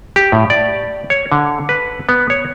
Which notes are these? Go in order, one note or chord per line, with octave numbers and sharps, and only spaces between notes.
G4
A2
D5
C#5
D3
B4
B3
C#5